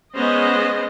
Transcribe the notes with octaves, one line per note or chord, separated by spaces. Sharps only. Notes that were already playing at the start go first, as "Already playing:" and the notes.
G#3 B3 C#4 C5 D#5